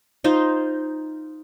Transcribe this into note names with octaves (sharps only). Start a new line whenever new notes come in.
D#4 F4 C5